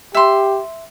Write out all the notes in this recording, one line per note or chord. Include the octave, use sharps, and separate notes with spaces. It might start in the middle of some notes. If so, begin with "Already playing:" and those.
G4 E5 C6